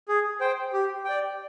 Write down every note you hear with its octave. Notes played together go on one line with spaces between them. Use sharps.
G#4
C5 G5
G4
D5 G5